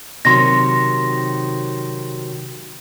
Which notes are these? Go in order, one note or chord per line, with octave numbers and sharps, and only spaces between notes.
C3 D#3 F#3 C6 A#6